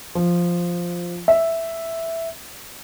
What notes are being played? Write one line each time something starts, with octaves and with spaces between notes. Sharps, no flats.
F3
E5